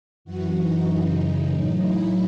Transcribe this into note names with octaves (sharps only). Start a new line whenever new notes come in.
F#2 E3 F#4
D#4
F#2 C#3 E3
D#4
A2 F#3 D#4
E4